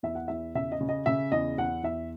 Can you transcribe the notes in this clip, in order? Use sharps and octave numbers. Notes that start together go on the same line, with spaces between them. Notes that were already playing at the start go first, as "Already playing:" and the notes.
E2 E5
F#5
E2 E5
C#3 E5
D#5
C#3
D#5
C#3 E5
E2 D#5
E2 F#5
E2 E5